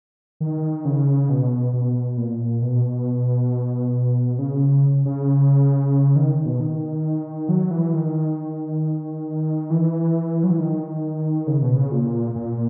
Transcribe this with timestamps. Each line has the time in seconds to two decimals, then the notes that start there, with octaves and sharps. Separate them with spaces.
0.40 D#3
0.85 C#3
1.29 B2
1.73 B2
2.17 A#2
2.62 B2
4.39 C#3
5.05 C#3
6.16 D#3
6.46 B2
6.60 D#3
7.49 F#3
7.71 E3
7.93 D#3
9.70 E3
10.44 F#3
10.51 E3
10.59 D#3
11.47 C#3
11.62 B2
11.77 C#3
11.92 A#2
12.36 A#2